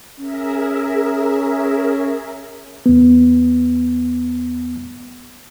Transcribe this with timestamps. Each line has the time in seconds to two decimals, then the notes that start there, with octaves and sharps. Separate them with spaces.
0.19 C#4 G#4 A#4 E5
2.86 E2 B3